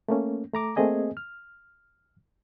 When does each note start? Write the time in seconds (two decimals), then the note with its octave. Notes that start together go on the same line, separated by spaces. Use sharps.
0.08 A3 A#3 C#4
0.53 A3 A#5 D6
0.76 A3 A#3 C4 G#4 D#5 G#5
1.17 F6